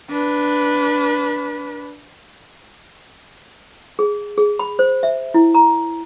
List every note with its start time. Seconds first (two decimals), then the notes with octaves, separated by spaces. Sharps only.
0.10 D4 B4
3.99 G#4
4.38 G#4
4.59 B5
4.79 C5
5.03 E5
5.34 E4
5.55 A#5